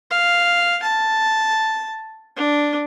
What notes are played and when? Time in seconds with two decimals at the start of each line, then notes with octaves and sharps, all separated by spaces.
0.11 F5
0.83 A5
2.37 D4